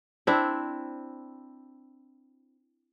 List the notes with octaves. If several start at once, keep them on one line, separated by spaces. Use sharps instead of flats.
C4 D4 E4